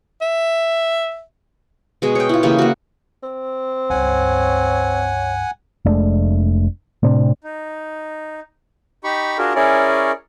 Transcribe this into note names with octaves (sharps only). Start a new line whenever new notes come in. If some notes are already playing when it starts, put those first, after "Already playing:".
E5
B2 G#3 G#4
C#5 G5
E4 F4
C#3 E3 A#3 G4
A#3 F#4
C4
C#2 G2 C#5 F#5 G#5
F1 G#3 A3 D4
A2 C3 C4 D4
D#4
D#4 G4 B5 C#6
D4 F4 F#4 G#4 A#4
C#4 E4 G#4 A#4 C#5 D5